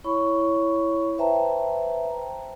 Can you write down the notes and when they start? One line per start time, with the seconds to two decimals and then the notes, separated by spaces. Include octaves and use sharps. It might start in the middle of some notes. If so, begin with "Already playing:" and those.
0.04 E4 C#5 B5 C#6
1.18 B4 C5 E5 G5 A5 A#5